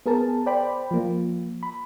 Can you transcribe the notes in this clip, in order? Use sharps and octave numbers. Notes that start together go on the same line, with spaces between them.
B3 G#4 A#4 A5
C5 D5 G5 B5
F3 A#3
B5